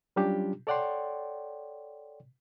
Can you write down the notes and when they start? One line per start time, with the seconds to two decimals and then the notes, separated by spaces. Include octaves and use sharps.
0.16 F#3 G3 C#4 D4 F4 G4
0.67 A4 C#5 D5 F#5 G5 C6